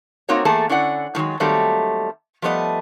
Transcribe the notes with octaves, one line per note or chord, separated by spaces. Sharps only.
A#3 C4 D#4 F#4 A#4 C#5
E2 A3 A#3 G#4 A4 A5
D3 C#4 E4 D5 F#5
A2 D#3 F#3 G#3
D#3 F#3 G3 A3 A#3 C4
F3 G3 A3 B3 D#5